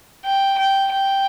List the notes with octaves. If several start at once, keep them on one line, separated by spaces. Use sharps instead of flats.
G5
G5
G5